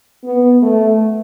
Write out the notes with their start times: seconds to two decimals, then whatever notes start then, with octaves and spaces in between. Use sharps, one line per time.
0.24 B3
0.62 A3